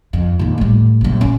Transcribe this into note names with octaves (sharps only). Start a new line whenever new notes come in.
F2
A#1 D#2
A2 G3
A#1 F#2
C#4